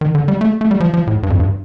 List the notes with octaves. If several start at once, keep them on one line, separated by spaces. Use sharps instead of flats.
D#3
D3
G3
A3
A3
G3
F3
F3
A2
G2
F2
G2